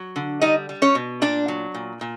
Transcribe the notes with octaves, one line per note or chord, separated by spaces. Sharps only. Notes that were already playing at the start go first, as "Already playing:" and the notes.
Already playing: F#3
D3
G3 D#4 D#5
G3
C#4 C#5
B2
A#2 D4 D5
F#3
A#2
A#2